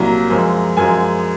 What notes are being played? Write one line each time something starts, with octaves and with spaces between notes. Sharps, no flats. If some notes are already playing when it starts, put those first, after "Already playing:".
Already playing: C2 A#2 F#3 A#5
F#2 F3 G#3
F#2 F3 G#3 G#5